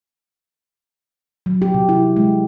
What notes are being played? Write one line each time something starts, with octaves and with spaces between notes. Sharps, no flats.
F#3
G4
C3
E4
G#3